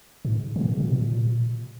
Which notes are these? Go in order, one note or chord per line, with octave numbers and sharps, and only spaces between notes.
G#2
C3
A#2
A#2
C3
A#2